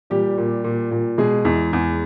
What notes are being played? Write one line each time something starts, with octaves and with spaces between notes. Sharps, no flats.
A#2 G3 G4
A#2
A#2
A#2
B2 G#3 G#4
E2
E2